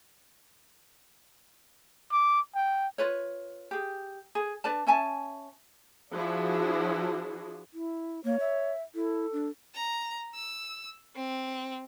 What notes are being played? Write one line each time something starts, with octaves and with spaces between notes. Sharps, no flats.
D6
G5
F4 B4 C#5
G4 G#4
G#4
D4 B4 D5 A5
C#4 E5 G#5 A5
F3 D4 E4 F#4 G#4
E4
A#3 C#5
E5
E4 A4
D4
A#5
E6
C4